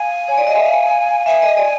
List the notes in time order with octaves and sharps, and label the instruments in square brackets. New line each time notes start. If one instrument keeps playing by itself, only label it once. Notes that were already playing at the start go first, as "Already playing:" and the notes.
Already playing: [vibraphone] F5 [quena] G#5
[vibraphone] C#5
D5
D#5
E5
F5
[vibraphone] E5 [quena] G#5
[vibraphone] D#5
D5